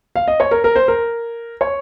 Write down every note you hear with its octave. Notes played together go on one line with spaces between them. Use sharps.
F5
D#5
C#5
A#4
A#4
C5
A#4
C#5